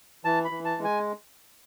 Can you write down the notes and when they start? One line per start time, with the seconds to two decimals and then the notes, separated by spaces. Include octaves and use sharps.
0.25 E3 A5
0.45 B5
0.51 E3
0.65 A5
0.78 G#3
0.84 G#5